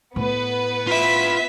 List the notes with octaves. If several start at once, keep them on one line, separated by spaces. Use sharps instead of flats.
A2 B3 B4
F4 E5 B5 B6